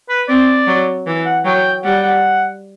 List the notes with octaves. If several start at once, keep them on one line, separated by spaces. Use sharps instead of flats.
B4
C4 D5
F#3
E3
F#5
F#3 G5
G3 F#5
F#5